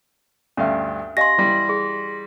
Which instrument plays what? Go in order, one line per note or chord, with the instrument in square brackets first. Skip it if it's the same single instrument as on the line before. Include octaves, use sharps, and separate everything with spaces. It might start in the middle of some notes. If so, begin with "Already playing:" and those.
[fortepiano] D2 G2 F5 [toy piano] C#4 E5
[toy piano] G4 D#5 F5 [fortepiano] G#5 [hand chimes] C6 A#6
[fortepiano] E3 G3
[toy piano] G#4